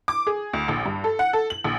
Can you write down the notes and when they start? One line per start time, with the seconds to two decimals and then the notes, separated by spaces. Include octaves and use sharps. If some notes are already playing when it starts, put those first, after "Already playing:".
0.08 D6
0.27 G#4
0.54 D2
0.68 A#1
0.86 G2
1.04 A4
1.19 F#5
1.33 A4
1.50 F#7
1.64 A#1